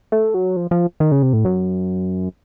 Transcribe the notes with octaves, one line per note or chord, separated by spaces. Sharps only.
A3
F#3
F3
F3
D#3
C#3
C3
A2
F#2